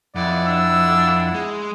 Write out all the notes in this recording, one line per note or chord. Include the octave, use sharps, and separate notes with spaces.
F2 E4 D5 F#5
D4 E6
G#3